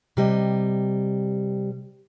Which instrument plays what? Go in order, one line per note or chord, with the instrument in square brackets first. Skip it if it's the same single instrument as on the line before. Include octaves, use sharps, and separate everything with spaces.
[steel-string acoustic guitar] C3 G3 D#5